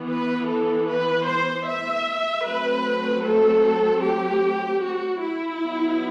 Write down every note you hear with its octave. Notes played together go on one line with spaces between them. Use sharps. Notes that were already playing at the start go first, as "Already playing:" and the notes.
Already playing: E3 B3
B4
A4
B4
C5
E5
F#3 A3 C4 B4
A4
G4
F#4
E4
F#3 B3